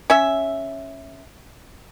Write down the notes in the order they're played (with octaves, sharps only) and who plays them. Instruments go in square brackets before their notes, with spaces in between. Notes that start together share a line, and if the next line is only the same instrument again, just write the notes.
[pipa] C#4 E5